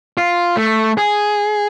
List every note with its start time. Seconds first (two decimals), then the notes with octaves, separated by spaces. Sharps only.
0.18 F4
0.57 A3
0.97 G#4